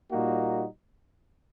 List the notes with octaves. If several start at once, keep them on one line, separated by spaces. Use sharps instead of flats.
A#2 G3 A#3 D#4 F#4